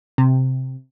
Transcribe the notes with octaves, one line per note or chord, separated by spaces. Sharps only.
C3